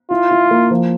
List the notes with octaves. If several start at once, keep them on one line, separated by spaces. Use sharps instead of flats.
E4 F4
E4
A#3
F3